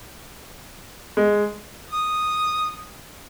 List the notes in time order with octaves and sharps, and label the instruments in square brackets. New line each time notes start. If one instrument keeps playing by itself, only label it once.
[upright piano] G#3
[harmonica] D#6